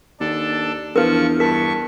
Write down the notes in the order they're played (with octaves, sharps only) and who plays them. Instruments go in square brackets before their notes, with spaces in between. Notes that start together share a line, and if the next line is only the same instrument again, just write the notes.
[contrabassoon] D#2 [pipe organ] D4 A4
[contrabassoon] E2 [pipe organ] F3 C#6 [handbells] D4 [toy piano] A#4 B4
[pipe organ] G2 C#6 [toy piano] A#4 [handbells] A5 B6